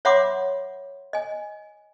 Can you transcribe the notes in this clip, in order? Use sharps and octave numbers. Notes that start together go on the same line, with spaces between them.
C#5 E5 F#5 B5 C6 D6
D#5 G#5